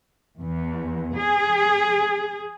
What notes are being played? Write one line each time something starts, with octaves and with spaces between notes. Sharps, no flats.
E2
G#4